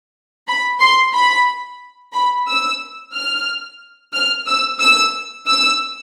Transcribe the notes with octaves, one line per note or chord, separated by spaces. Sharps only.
B5
C6
B5
B5
E6
F6
F6
E6
E6
E6